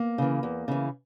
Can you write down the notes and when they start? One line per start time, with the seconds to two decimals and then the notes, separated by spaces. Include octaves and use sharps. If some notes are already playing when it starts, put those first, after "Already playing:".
Already playing: A#3
0.18 C#3 E3
0.43 E2
0.68 C#3 E3